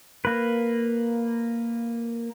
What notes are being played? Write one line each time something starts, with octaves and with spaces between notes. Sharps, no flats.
A#3 B4